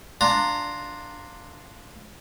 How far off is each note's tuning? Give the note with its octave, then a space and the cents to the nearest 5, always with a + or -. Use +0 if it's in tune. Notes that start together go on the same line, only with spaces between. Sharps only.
D4 +0 F4 +0 A#5 -15